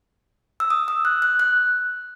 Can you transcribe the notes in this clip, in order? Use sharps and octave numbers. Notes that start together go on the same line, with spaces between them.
E6
D#6
E6
F#6
F#6
F#6